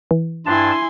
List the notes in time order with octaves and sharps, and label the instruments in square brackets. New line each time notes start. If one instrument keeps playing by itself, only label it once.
[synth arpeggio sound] E3
[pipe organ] G2 D4 A5 [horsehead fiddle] E4 G#5 [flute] C6